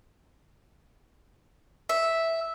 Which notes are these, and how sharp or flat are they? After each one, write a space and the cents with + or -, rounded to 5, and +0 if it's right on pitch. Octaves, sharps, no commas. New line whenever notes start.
E5 -5